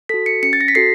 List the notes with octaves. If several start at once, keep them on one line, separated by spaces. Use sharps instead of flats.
F#4 A4 B6
C#7
C#4 C#7
A6
A#6
B6
F#4 A4 C7